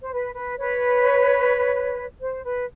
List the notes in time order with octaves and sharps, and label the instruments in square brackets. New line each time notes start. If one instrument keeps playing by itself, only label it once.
[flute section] C5
B4
B4
B4 C#5
C5
B4